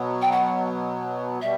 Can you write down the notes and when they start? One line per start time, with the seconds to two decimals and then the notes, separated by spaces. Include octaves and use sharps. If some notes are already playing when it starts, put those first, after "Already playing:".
Already playing: B2 F#3 B3
0.22 G5
0.32 F#5
1.41 B2 G3 E5